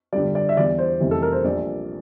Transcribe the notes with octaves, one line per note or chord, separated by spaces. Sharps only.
G1 G2 D3 G3 D5
D5
E5
E2 E3 G3 D5
C5
F1 F2 E3 G3
A4
A#4
C5
A#1 A#2 G3 D5